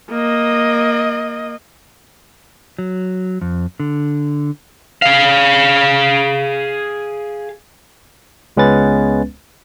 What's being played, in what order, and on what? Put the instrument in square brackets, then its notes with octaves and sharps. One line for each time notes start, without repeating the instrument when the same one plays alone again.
[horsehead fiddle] A#3 D#5
[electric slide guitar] F#3
F2
D3
[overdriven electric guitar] G#4 F5
[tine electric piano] C#2 G#3 B3 C#4 B4 A6